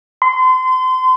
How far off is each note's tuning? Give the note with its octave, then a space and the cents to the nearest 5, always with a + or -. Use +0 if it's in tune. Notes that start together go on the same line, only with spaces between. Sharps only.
C6 -30